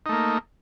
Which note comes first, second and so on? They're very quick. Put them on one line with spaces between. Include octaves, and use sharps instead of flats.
D#4 A3 A#3